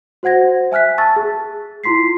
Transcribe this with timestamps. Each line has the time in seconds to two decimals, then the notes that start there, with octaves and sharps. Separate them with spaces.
0.23 F#4 C5 F#5 G#6 A#6
0.72 E5 G#5 F6 F#6 B6
0.98 A5 C#6 E6 A6
1.16 G#4
1.84 E4 F4 C6 B6 C7